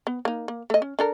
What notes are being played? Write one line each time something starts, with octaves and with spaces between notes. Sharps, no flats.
B3
A#3 D#4
A#3
A3 D#5
C#4
D4 A4 A#4